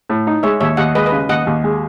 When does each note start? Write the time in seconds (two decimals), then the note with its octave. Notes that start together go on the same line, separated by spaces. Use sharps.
0.10 A2
0.27 D#4
0.43 G#3 C#5 E5
0.61 D#2 C#5 E5
0.77 D#2 D#5 F#5
0.95 G#3 B4 D#5
1.06 B4 D#5
1.12 C#3
1.29 D#2 D#5 F#5
1.47 D#2
1.64 G#3